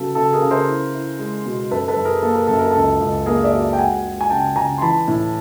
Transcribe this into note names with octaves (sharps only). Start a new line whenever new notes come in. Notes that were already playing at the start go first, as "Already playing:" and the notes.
Already playing: C#3 F#3 B3 A4
C#3 A4
G#4 A#4
C#3
A#4 C5
E4
E4
G#3
B2
F#2 A4 B4
A4 B4
F#2
G#4 A#4
A#3 A4
A#4
F#2 A4
A#4
C#2 A4
C#2
A#3 G#4 A#4
D5 E5
F#3
G5
G#3 F#5 G#5
G#3
G#5
C#3 G5 A5
C#3 G#5 A#5
C6
E3 A5 B5
A2